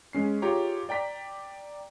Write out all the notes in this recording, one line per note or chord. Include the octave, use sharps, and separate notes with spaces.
G#3 C#4 C7
F4 G4 G#4 C#5 A#5
D5 G5 A#5 B6